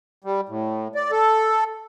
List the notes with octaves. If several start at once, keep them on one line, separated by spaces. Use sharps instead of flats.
G3
A2
D5
A4